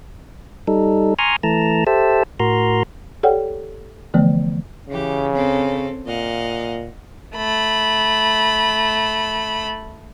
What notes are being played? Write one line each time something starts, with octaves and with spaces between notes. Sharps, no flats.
G3 D#4 A4
G#5 A#5 C6 C#6 D#6 F6
E3 A3 A5 A#5
G4 A4 C5 E5 A5
A2 F#4 A#4 A#5 C6
G4 A4 C#5 D5 F#5 G5
D3 E3 F3 A3 B3
C#3 E3 G4
C4 C#4 A4
A#2 D#5 F5 F#5
A3 B5